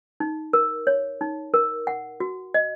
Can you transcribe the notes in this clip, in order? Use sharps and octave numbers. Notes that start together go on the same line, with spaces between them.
D#4
A#4
C#5
D#4
A#4
F#5
F#4
D#5